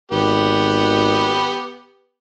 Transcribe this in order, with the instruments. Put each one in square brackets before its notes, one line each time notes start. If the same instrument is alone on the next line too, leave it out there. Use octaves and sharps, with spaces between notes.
[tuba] G#1 [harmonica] B3 G4